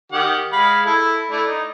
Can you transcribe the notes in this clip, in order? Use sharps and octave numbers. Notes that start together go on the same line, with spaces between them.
D#3 G4 F#5
G#3 F5 B5
E4 A4
A3 D4 E4
D#4